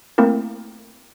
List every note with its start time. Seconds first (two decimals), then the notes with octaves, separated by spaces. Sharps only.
0.18 A3 A#3 C4 E4 A#4